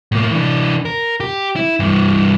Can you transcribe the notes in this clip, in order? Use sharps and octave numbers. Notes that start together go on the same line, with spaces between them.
A2 A#3
E3 D4
A#4
G4
E4
G2 E3